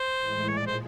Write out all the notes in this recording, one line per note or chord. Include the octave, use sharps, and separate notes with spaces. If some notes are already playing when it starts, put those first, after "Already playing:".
Already playing: C5
A2 E3 G#3
A#2 F3 G#3 C#5
D5
C5